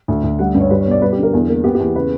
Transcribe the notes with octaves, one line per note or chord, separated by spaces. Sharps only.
D2
D2
G3 F#5
G2
C#5
G3 B4
C#5
B2 D5
G3 B4
G4
D3
A#4
E2
A#3
B3 G4
G4
E2
C#3 B4